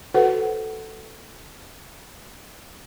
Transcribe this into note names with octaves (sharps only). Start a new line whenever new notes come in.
F#4 A4 B4 C5 F#5